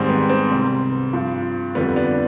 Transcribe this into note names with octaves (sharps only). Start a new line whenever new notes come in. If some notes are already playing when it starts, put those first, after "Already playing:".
Already playing: G#2 D#3 G3 C4
B3
C4
C2 C3 G3
G2 F3
F2 D3 G3 B3
B3 D4